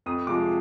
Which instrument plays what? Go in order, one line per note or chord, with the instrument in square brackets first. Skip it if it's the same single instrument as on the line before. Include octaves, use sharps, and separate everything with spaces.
[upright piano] F2 D#6
C3 F3 G#3 D6